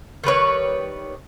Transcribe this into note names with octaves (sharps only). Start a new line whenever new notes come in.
D#3 G3 B4 C#5